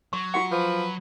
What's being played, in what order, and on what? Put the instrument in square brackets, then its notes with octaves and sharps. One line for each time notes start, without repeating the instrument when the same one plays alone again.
[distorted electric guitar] F#3 [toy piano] C#6
[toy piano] F4 F#4 F#5 [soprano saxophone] C#6
[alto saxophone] F3 [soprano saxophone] B4